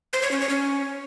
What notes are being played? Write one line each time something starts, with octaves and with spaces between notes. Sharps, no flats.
C5
C#5
C#4
C#5
C#4